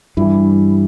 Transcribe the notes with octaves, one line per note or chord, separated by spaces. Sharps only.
G2 E3 G3 E4